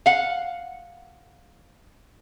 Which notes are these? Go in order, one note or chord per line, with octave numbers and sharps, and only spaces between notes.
F5 F#5